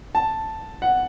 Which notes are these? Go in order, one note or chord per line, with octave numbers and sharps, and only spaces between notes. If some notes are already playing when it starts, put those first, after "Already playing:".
A5
F#5